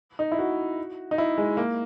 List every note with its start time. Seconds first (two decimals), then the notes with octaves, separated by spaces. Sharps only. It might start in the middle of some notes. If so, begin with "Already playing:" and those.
0.19 D#4
0.32 E4
0.39 F#4
1.11 D#4
1.18 E4
1.38 G#3
1.57 A#3